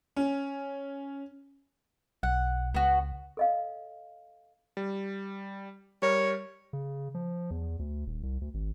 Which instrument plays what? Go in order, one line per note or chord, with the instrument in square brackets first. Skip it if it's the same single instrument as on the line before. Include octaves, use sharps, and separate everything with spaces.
[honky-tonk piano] C#4
[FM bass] B1 [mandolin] F#5
[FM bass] C#2 [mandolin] B3 F#4
[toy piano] A4 D#5 F5
[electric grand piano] G3
[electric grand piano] G3 A#4 [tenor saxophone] C#5
[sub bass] C#3
F3
E2
D2
D#1
C2
D2
G#1